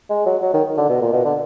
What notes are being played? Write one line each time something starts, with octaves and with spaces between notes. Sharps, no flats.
G#3
F#3
F#3
D#3
D3
B2
A#2
B2
D3